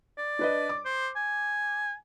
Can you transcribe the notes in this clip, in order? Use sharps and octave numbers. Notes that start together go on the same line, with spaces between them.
D5
D4 B4 D#5
D6
C5
G#5